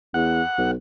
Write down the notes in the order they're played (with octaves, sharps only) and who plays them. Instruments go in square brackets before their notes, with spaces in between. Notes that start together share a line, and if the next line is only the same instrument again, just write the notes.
[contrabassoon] E2 [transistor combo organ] F#5
[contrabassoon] B1